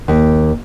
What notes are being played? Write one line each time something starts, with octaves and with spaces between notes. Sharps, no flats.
D#2